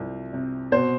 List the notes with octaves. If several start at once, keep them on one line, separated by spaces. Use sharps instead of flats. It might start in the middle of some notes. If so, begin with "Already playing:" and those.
Already playing: C2 F3 C4
C3
B2 C5